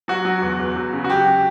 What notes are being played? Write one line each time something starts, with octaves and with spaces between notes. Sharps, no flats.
F#3 F#4
F#3
E2
E2
F#3
C#3
F#4
F#3 G4